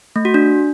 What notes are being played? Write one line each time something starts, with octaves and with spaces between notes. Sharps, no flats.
A3
F#4
D4